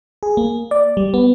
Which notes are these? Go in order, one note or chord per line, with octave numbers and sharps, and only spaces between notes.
G#4
A#3
D5
G3
B3